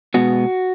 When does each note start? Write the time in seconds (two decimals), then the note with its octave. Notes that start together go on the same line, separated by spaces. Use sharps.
0.14 B2 G#3 B3 F#4